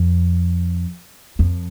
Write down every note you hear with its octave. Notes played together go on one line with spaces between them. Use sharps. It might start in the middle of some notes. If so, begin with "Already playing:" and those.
Already playing: F2
F2